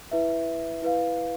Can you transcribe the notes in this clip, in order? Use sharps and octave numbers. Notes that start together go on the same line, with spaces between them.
E4 B4 E5
E4 B4 F5